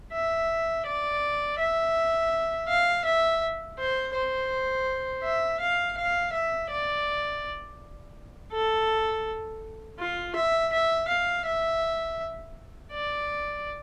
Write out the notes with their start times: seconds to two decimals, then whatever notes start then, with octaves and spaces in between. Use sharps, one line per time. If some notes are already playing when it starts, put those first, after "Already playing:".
0.13 E5
0.86 D5
1.59 E5
2.68 F5
3.05 E5
3.78 C5
4.14 C5
5.23 E5
5.60 F5
5.97 F5
6.33 E5
6.70 D5
8.53 A4
9.99 F4
10.36 E5
10.73 E5
11.08 F5
11.46 E5
12.92 D5